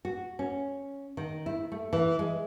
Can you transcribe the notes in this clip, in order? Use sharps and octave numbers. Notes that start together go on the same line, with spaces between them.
F#4
C#4
D#3
E4
A3
E3
G#3